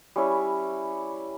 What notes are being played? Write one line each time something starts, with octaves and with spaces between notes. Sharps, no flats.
G3 C#4 E4 C#5